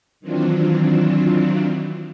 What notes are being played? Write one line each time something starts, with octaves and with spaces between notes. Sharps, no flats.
D#3 E3 F#3 C4 D4 F4